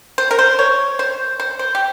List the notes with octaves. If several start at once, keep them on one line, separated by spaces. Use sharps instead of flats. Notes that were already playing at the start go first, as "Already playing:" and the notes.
C5
A#4
C5
C#5
C5
C5
C5
G4